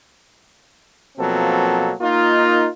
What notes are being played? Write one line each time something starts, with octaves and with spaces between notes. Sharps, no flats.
B2 F3 F#3 A#3 C4 A4
A#3 D#4 F4